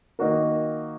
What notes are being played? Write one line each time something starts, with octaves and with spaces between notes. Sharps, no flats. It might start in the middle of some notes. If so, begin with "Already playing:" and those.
D#3 A#3 D#4 F#4 A#4